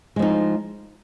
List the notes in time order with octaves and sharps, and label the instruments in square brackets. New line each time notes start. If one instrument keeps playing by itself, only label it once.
[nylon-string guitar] G#3
F3
D#4